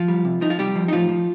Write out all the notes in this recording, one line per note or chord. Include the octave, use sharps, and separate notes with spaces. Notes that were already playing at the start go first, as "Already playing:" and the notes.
Already playing: F3 F4
G3
C3
F3 D#4
F4
C3 G3 G4
F3
D#4
A2 F3 F4
F3